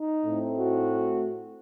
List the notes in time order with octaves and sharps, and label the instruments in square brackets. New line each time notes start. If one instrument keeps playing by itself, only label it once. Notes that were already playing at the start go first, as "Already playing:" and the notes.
Already playing: [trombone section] D#4
A2 A3 C4
F#4